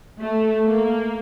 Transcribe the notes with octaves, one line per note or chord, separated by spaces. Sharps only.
A3
A#3